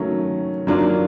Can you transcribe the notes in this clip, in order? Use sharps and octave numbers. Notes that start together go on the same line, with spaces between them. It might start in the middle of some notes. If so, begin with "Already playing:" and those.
Already playing: D#3 F#3 A3 C#4
D#3 F#3 A#3 D4 F4